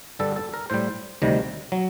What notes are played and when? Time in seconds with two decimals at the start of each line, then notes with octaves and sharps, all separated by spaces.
0.19 G2 D3 G3 A4
0.36 A4
0.54 A#4
0.70 A2 G3 C5
1.22 D2 C3 D#3 G3
1.72 F#3